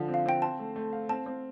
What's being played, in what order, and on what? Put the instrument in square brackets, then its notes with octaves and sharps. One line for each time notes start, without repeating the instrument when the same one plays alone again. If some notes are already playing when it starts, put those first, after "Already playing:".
Already playing: [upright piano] D3 F3
C4
[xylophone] F5
[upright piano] C4 [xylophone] G5
[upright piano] C5 [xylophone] A5
[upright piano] A3
A3
F5
[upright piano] C4 [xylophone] A5
[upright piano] C4